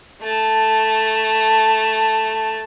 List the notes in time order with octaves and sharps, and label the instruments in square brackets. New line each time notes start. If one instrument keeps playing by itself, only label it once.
[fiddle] A3 A5